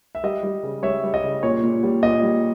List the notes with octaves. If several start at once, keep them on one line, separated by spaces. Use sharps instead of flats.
E5
G3 D#5
G3
C#3
G3 C#5 E5
G3
D#5
C#3
A#2 C#5
A#2
G3
A#2 D#5
G3